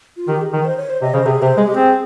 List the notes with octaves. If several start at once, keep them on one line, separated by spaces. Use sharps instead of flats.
F4
D#3 G4
G#4
D#3 A#4
C5
C#5
C5
C3 D#5
C#3 C5
C3 G#4
C3 C5
G#3 G#4
G4
C4 G#4